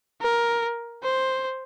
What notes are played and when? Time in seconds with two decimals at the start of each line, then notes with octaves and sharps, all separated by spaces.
0.22 A#4
1.03 C5